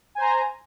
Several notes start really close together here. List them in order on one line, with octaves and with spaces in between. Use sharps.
G#5 C5 A#5